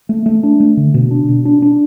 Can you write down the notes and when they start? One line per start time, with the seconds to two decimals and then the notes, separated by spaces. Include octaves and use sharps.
0.09 A3
0.26 A3
0.43 D4
0.60 A3
0.77 D3
0.94 B2
1.11 D4
1.29 B2
1.45 D4
1.62 D4